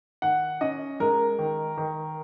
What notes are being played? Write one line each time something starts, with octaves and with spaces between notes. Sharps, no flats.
D#3 F#5
C#4 D#5
G#3 A#4
D#3
D#3